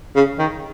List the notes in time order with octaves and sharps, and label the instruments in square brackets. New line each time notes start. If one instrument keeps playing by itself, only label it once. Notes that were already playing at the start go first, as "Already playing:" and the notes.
[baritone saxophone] C#3
D#3